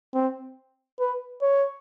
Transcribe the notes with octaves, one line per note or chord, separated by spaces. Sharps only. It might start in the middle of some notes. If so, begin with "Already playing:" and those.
C4
B4
C#5